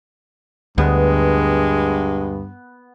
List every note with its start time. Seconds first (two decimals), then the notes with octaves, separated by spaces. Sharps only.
0.78 D2 G2 G#3 B3